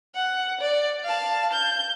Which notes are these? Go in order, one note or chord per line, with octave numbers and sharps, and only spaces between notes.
F#5
D5
F5 A5
G6